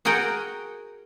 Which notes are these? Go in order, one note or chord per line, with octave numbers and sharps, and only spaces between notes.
F#4 G#4 A#4 F#5 G5